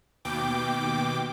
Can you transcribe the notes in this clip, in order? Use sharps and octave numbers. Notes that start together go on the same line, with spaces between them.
D#2 B2 G5 D6